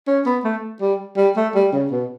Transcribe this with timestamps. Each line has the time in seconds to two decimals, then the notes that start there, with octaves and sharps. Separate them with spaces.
0.07 C#4
0.26 B3
0.44 A3
0.81 G3
1.17 G3
1.36 A3
1.55 G3
1.72 C#3
1.91 B2